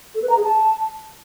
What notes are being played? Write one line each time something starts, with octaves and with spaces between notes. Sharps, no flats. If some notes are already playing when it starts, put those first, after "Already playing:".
A4
B4
A#5
G#4
A5